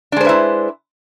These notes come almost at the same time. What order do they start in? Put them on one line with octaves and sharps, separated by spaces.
D4 G#3 C5 B4 E4